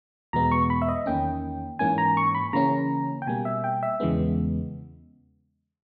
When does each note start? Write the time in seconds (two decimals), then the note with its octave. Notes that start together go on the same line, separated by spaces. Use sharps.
0.33 E2 B2 G#3 B3 A#5
0.52 C#6
0.70 B5
0.82 E5
0.88 D#5
1.06 E2 D#3 A#3 C#4 G5
1.79 G#2 E3 A#3 C#4 G#5
1.98 A#5
2.17 C#6
2.35 B5
2.53 C#3 E3 A#3 C#4 A#5
3.22 G5
3.27 B2 G3 A#3 G#5
3.45 E5
3.64 G5
3.83 E5
4.00 E2 C#3 E3 G#3 B3